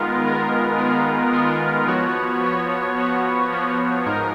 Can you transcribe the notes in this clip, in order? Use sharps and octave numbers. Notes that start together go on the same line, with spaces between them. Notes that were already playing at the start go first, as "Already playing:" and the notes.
Already playing: D#3 G#3 B3 F4 A#4
D#3 G#3 B3 F4 A#4
D#3 G#3 B3 F4 A#4
D#3 G#3 B3 F4 A#4
F3 B3 F#4 C#5
F3 B3 F#4 C#5
F3 B3 F#4 C#5
F3 B3 F#4 C#5
G#2 F3 G#3 D#4 A#4